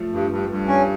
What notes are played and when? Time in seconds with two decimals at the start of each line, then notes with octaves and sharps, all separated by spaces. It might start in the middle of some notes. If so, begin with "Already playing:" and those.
Already playing: F3 A3
0.12 G2
0.30 G2
0.49 G2
0.67 C#4